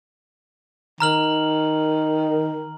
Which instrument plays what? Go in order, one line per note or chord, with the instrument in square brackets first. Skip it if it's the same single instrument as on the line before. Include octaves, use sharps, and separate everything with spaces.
[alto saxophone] D#3 [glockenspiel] A#5 F6 F#7